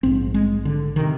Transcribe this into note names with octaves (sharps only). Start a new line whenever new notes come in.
A#1 G#2 C4
G#3
D3
C3 D#3